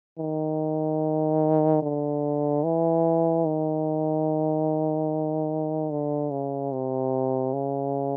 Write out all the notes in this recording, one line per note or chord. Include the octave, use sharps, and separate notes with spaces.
D#3
D3
E3
D#3
D3
C#3
C3
C#3